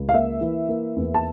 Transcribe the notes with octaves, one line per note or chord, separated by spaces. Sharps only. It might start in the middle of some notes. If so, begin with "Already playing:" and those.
Already playing: C#2
F5
A#3 E5
E3
A#3
E2
A5